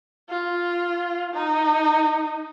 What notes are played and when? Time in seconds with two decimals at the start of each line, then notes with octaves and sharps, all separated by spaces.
0.29 F4
1.34 D#4